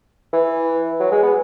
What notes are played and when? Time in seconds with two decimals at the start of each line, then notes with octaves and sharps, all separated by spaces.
0.33 E3
1.00 F#3
1.11 G#3
1.23 B3